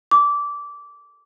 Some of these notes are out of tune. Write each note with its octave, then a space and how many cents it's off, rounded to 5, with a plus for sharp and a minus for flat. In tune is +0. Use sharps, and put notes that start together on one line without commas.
D6 -20